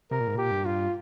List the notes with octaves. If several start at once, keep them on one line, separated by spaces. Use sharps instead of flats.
C3 A#4
A#2
G#2
A#2 G4
G2
F4